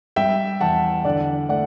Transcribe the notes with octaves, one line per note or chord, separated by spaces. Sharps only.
G3 E5 G5
E2 F#5 A5
D3 D5 F#5
A3 D5 F#5